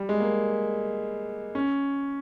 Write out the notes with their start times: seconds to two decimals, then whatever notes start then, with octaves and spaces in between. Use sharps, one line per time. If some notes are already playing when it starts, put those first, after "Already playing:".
Already playing: G3
0.09 G#3
0.20 A#3
1.55 C#4